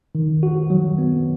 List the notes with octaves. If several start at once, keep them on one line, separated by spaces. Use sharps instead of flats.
D#3
F#4
F#3
B3